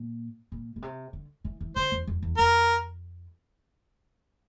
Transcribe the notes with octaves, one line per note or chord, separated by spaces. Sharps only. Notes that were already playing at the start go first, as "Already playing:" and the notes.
Already playing: A#2
A#2
A#2
C3
D3
E3
E3
D3 C5
E2
F2
E2
F2 A#4